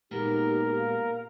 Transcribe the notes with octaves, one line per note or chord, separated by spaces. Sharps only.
A#2 G#3 B3 D#4 G4 A#4
F5